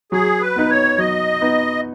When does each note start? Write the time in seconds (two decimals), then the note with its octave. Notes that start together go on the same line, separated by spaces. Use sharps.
0.12 F#3 G#4
0.41 B4
0.56 B3 D#4
0.70 C#5
0.98 F#3 D#5
1.41 B3 D#4